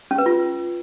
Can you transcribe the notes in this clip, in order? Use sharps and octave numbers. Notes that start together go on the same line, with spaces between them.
C#4
B4
F4